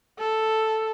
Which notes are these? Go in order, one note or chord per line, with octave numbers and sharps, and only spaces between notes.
A4